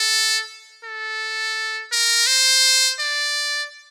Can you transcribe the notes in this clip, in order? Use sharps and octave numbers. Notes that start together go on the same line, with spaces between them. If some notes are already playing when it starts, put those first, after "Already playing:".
Already playing: A4
A4
A#4
C5
D5